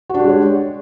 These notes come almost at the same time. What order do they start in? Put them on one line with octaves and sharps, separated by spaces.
F#4 D4 G4 G#3 C#5